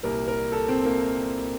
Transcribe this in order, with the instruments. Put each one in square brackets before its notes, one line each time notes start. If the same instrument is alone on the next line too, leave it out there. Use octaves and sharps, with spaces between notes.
[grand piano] C2 A#2 G3 A#4
A#4
A4
C4
A#3